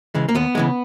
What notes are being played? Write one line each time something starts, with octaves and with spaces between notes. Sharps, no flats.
C#3 E3 G#3
A#3
D#2 B3
C#3 E3 G#3